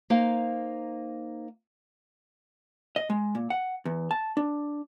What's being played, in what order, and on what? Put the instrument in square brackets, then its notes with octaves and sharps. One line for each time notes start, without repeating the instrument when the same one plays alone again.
[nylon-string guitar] A#3 D#4 C5 F5
[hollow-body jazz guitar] D#5
G#3
A#2
F#5
E2
A5
D4